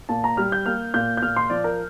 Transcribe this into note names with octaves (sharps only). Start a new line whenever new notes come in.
A#2 A5
A#5
G3 F6
G6
A#3 F6
A#2 G6
G6
A#2 F6
C6
F3 D5
A#4